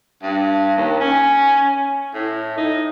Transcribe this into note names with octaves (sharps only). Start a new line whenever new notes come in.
G2
D#2
C#4
A2
D#4